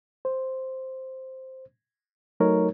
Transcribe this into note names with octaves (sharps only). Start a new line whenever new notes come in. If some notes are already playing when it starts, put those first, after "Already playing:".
C5
F#3 A3 D#4 A#4 C#5